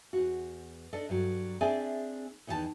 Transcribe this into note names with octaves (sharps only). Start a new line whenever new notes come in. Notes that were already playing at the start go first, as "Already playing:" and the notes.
E2 F#4
D4 A4 D5 D#5
G2 F#3
C4 D4 G#4 D5 E5 G#5
E2 D#3 E3 G4 A5